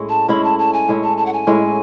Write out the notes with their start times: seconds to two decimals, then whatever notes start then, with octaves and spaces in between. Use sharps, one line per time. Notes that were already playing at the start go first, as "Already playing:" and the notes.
Already playing: A2 G#3 C#4 E4
0.09 A5
0.28 A2 G#3 C#4 E4 B5
0.44 A5
0.59 A5
0.73 G#5
0.88 A2 G#3 C#4 E4
1.04 A5
1.17 A5
1.26 F#5
1.33 G#5
1.47 A2 G#3 C#4 E4